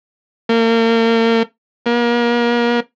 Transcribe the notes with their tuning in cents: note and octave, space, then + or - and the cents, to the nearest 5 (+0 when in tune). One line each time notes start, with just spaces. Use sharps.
A#3 -35
A#3 +35